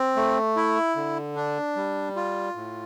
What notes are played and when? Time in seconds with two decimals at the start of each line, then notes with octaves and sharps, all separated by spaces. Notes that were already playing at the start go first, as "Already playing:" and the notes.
Already playing: C4
0.16 A3
0.56 E4
0.96 D3
1.36 D4
1.76 G3
2.16 F4
2.55 A2